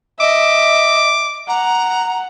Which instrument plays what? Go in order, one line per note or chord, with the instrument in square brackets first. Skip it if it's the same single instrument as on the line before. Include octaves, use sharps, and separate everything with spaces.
[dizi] D#5 [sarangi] E5 [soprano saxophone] D6
[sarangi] F#5 [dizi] A#5